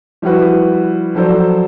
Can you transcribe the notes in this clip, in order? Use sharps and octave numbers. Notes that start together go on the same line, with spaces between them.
F3 G3 E4 F#4 B4
F3 F#3 A4 C5 D5